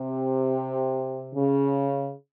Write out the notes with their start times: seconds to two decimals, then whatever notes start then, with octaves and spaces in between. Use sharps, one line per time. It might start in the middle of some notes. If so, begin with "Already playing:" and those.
Already playing: C3
1.34 C#3